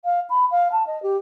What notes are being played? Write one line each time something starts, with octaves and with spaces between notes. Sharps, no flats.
F5
B5
F5
A5
D#5
G4